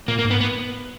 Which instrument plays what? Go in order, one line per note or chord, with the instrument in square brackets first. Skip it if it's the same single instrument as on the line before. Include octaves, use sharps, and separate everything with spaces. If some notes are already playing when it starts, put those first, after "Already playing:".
[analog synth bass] A#2 [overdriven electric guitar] A#3
[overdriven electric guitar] A#3
[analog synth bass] G#2
[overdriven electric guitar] B3
B3